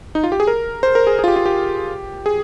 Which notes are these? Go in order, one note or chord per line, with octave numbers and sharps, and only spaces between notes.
D#4
F4
G4
G#4
A#4
C5
A#4
G#4
G#4
F4
G4
F4
G4
G#4